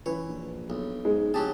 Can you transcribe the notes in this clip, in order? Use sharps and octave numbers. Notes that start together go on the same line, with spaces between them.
E3 C#5
A#1
B1
G#2 G#3
D1 F#3 G4 G#4 A5